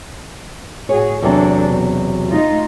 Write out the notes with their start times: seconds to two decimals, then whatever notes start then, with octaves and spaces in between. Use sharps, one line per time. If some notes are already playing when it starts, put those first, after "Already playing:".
0.89 A2 F#4 G#4 C#5
1.22 E2 C3 F#3 D4 A4
1.67 B2
2.29 A3 D#4 F4